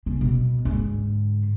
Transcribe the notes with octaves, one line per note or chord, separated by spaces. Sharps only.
C#3
B2
G#2 D3